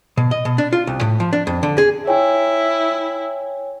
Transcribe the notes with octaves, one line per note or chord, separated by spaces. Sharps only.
B2
D#5
B2
D4
F4
C2
A2
F3
D4
F2
D3
G#4
E4 C#5 G5 G#5